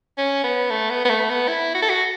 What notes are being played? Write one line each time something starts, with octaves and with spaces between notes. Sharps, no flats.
C#4
B3
A3
B3
B3
A3
B3
E4
F#4
A4
F#4